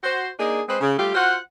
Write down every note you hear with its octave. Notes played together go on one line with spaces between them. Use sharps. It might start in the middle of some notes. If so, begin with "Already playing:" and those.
F#4 C5
A#3 D4 D#4 G#4
G#3 C4 B4 C5
C#3
G3 A3 F4 G4
F4 F#4 C5 F#5